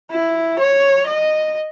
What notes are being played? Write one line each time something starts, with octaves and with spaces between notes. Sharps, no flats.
E4
C#5
D#5